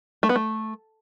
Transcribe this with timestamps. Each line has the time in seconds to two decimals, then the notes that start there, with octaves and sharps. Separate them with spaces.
0.23 A3
0.29 B3
0.36 A3